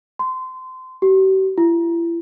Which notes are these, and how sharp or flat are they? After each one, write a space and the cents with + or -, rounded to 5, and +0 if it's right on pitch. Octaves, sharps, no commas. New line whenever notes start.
C6 -25
G4 -45
E4 +35